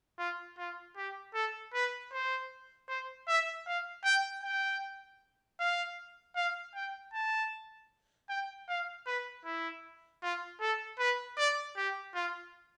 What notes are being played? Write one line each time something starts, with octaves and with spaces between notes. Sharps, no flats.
F4
F4
G4
A4
B4
C5
C5
E5
F5
G5
G5
F5
F5
G5
A5
G5
F5
B4
E4
F4
A4
B4
D5
G4
F4